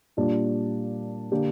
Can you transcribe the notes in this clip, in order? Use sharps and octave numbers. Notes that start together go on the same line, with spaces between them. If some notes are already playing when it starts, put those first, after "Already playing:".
A#2 G3 D4 F4
D3 A#3 D4 G4